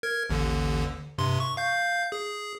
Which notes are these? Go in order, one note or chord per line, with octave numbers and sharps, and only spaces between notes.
A#4 G#6
A1 D#2 D3
G2 C3 C6
C#6
F5 G6
G#4